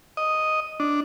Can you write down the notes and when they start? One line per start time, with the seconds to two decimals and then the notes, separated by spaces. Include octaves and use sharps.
0.17 D#5
0.80 D4